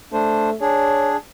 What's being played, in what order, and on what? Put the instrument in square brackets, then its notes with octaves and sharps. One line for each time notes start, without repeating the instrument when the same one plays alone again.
[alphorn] A3 [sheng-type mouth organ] D4 C5
[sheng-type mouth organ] D4 G#4 [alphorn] C#5